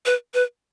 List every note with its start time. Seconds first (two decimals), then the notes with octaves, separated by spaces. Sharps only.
0.06 B4
0.34 B4